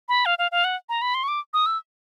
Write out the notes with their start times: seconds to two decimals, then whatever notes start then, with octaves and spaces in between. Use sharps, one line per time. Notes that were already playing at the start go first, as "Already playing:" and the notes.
0.09 B5
0.26 F5
0.39 F5
0.52 F5
0.64 F#5
0.89 A#5
1.02 B5
1.14 C6
1.23 C#6
1.28 D6
1.54 D#6
1.66 E6